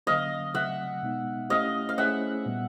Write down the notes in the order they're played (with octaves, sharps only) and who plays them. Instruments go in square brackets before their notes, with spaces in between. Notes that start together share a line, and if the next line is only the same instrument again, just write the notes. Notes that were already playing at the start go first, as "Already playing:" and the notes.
[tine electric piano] D3 F#3 A#3 C#4 [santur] D#5 F5
[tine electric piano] C#3 F#3 A3 C4 [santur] E5 F#5
[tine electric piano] B2 G#3 B3 D#4
[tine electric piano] A3 C#4 E4 G4 [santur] D#5 F5
[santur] F5
[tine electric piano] A3 C#4 E4 G#4 C5 [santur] E5 F#5
[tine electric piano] A#2 G3 B3